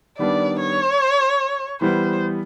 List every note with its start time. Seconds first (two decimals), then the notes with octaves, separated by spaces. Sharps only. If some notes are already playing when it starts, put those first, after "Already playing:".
0.19 D#3 G3 B3 D4 D5
0.59 C#5
1.81 E3 G3 B3 C5